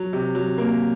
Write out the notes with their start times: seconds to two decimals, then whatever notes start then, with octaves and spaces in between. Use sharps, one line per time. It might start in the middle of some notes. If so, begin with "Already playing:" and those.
Already playing: F#3
0.13 C3
0.35 F#3
0.58 A#3